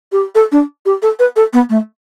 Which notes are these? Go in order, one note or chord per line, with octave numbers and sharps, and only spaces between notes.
G4
A4
D4
G4
A4
B4
A4
B3
A3